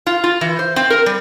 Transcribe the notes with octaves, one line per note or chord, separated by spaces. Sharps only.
F4
F4
E3
C5
C4
A#4
G3